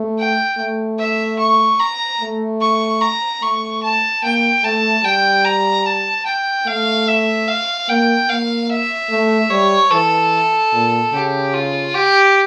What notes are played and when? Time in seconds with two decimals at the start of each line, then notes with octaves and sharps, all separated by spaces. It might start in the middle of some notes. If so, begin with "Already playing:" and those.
Already playing: A3
0.18 G5
0.58 A3
0.99 E5
1.39 C#6
1.80 A#5
2.21 A3
2.61 C#6
3.02 A#5
3.42 A3 C#6
3.83 A5
4.23 A#3 G5
4.64 A3 A5
5.05 G3 G5
5.45 A#5
5.86 A5
6.26 G5
6.67 A3 F5
7.08 E5
7.48 F5
7.89 A#3 G5
8.29 A#3 F5
8.70 E5
9.10 A3
9.50 G3 C#5
9.91 E3 A4
10.73 A#2
11.13 C#3 G4
11.53 F4
11.94 G4